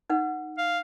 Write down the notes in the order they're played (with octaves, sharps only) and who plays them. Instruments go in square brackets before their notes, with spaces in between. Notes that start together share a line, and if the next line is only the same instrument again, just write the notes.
[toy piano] D#4 B4 F#5
[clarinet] F5